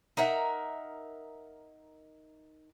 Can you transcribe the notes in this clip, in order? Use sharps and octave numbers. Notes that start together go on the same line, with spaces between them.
D#4 A#4 E5 F#5